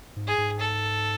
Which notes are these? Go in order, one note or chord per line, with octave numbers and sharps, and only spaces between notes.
G#2
G#4
G#2
A4